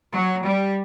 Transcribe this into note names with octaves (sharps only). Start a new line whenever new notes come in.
F#3
G3